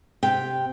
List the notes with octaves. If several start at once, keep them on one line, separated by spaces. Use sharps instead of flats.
C3 G5